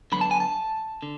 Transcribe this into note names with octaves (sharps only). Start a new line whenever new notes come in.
D3 F#3 B3 B5
A5
G#5
A5
D3